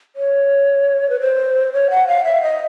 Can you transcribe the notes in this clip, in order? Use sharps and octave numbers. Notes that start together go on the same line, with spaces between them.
C#5
B4
C5
C#5
F#5
F5
E5
D#5